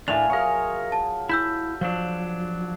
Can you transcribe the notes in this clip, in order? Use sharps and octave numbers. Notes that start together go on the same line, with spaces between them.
A2 A3 D4 A#4 E5 F5 G#5 F7
F#3 F4 G#4 A#4 C#5
A5
E4 A5 E6 G6 B6
F3 F#3 D4